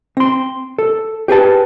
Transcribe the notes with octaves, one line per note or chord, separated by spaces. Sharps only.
C4 C6
A4
G4 G#4 B4 A5